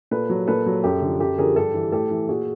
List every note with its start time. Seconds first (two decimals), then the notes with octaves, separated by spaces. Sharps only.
0.11 A#2 A4 B4
0.30 F#3
0.47 A#2 A4 B4
0.66 F#3
0.84 F#2 G4 A4
1.02 D3 F3
1.20 F#2 G4 A4
1.38 D3 F3 G#4 A#4
1.56 G2 G4 A4
1.74 E3
1.92 A2 G4 A4
2.11 E3
2.29 A#2 F#4 G#4